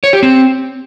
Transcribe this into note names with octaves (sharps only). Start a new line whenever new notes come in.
C#5
G4
C4